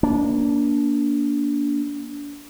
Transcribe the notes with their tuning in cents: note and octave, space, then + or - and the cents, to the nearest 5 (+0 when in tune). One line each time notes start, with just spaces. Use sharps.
A#3 +15 D4 -25